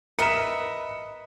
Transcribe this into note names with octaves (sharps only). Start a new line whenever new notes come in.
A#4 B4 D#5 E5 C#7 E7